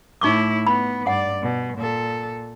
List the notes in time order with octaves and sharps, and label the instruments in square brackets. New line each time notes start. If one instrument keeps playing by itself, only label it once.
[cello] A2 E4 [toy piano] D#4 C#6 D6
[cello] B3 [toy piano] B5
[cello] G2 D5 [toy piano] F#5
[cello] B2
A#2 A4